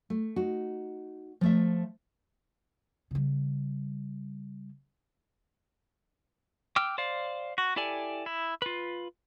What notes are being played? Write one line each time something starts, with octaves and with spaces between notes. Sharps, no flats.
A3
D#4 F#4
F3 A3 E5
C#3 G3
G5 D6 E6 F6
C5 D5 F5
F#4
E4 G4 A4 D5 G#5
E4
F4 B4